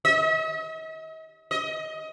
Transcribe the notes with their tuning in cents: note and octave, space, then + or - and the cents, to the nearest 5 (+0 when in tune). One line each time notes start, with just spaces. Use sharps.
D#5 +45
D#5 +20